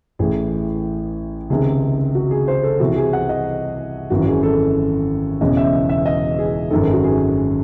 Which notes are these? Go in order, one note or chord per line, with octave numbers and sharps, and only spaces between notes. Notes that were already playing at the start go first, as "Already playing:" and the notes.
A1 A2 E3 G#4
C#2 C3 D#3 G#4
F#4
G#4
C5
A4
C2 C3 E3 F#4
G#4
F#5
D#5
G#1 F#2 E3 F#4
G#4
A4
E1 E2 C#3 E3 D#5
E5
E5
D#5
G#4
G#1 F#2 D#3 A4
G#4
F#4
G#4